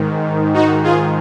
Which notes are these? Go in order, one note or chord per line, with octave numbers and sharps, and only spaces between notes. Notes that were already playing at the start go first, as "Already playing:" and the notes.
Already playing: G#2 D#3
D#4 F#4
F4 G#4